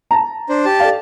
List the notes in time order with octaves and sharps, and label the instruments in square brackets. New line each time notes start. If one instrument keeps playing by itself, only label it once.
[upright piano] A5 A#5
[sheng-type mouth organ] D4 C5
G4 A5
[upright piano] A4 D5 F5